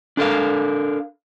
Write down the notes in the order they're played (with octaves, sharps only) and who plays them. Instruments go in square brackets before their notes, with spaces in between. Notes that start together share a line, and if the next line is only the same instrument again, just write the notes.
[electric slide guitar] D4 A4 A#4 F5